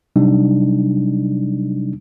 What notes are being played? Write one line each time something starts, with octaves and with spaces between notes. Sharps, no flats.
C3 F#3 G3 D4 D#4